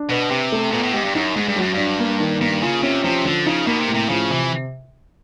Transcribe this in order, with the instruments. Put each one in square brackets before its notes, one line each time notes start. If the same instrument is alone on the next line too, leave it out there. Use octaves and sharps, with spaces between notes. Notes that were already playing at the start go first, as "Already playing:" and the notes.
Already playing: [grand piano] D4
[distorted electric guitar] B2 [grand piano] B4
[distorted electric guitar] C3 [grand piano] G4
[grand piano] A3
[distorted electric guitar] A#2 [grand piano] B3
[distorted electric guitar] A2
[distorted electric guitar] G#2 [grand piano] G4
[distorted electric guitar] G2
[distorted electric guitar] F#2 [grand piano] D#4
[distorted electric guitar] G#2 [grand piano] G#3
[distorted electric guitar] G2
[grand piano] F#3
[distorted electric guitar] F#2
[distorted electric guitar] G2 [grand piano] D4
[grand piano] A#3
D#3
[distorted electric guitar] G2 [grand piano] A#3
[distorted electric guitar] C#3 [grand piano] F4
[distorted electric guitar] C3 [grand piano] C#4
[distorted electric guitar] C3 [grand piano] F3
[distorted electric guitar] D3 [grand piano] F3
[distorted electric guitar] C#3 [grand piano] D#4
[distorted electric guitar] B2 [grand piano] A#3
[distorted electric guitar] C3
[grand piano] A2
[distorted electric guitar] C3
[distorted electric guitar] C#3 [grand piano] F3
[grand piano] C3 [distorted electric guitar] E3